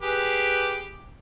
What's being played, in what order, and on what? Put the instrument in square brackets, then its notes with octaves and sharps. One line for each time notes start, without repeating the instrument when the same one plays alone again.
[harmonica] G4 G#4 B4